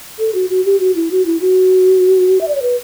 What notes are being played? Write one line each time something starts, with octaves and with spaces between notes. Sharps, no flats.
A4
F#4
F#4
G4
F#4
E4
F#4
E4
F#4
E5
D5
C#5
B4